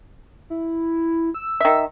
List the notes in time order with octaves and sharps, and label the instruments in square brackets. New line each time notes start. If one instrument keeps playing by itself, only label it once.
[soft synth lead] E4
E6
[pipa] D#3 E5